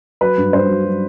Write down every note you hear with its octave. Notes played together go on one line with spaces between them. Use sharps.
F#3 B4
G2
G2 C5
F#3
F#3